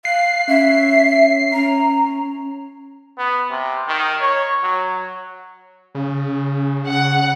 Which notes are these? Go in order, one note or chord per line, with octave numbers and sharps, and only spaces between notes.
F5 F#6 C7
C#4 E5
C#4 A#5
B3
C3
D#3
C#5
F#3
C#3
F#5